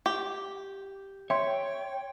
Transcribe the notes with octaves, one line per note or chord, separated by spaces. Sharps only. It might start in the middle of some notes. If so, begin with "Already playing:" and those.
G4
C#5 E5 G5 C6